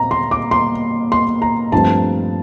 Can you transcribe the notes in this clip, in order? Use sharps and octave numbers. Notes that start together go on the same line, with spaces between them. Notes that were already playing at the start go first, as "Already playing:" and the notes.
Already playing: A#2 C4 A#5
C6
D6
C6
C6
A#5
G2 F3 A3 C4 A5